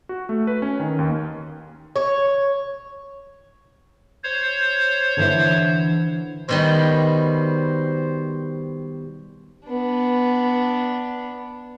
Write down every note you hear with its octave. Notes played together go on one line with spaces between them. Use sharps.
F#4
A3
B4
C#4
D#3
D#2
C#5
C5 C#5
D3 E3 E4
B2 D#3 G3 C5
B3 D4